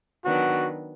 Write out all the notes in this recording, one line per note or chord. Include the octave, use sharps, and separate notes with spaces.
D#3 F#3 B3 D4 F#4